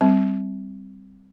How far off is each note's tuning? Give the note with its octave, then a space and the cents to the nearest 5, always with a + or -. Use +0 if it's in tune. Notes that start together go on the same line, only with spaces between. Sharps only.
G3 +0 C4 +0